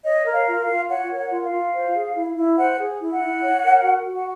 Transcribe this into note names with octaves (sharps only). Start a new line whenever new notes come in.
C#5 D#5
A#4
F5
F4
F5
F4
C#5 F#5
A#4
F#5
F4
F5
F4
C5
G#4
E4
E4
C5 F#5
G#4
E4
F#5
E4
C#5
A#4
F#4
F#4
F#5